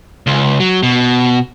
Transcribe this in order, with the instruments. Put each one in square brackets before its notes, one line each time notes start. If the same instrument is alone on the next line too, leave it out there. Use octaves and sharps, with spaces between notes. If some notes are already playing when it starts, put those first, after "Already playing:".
[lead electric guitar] C#2
F#3
B2